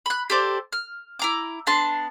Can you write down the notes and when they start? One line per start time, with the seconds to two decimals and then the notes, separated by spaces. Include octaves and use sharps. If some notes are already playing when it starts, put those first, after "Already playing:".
0.06 B5 F#6
0.30 G4 A4 C5 D5
0.73 F6
1.19 E4 A#5 D6
1.67 B3 D4 A5 C6